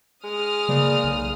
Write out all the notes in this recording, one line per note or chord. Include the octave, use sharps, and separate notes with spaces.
G#3 D#6 F6
C#3 A#3 D5
B1